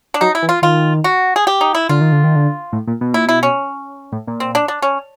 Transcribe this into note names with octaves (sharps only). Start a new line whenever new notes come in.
D4
F#3 D#4
E4
E3
F4
D#3 F4
F#4
G#4
G4
D#4
E4
D3 F4
D#3
D3
D#3
D3
A2
A#2
B2
A#2 E4
B2 E4
C#4
A2
A#2
C4
D4
D4
C#4